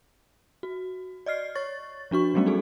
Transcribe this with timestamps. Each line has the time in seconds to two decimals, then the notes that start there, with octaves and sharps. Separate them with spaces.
0.63 F#4
1.26 D5 D#5 F6 C7
1.55 C#5 C#6 A6
2.11 F3 D4 F#4 C#6
2.34 F#3 G3 A3 B3 C#4 F#4
2.46 D#4 F#4 G#4 A4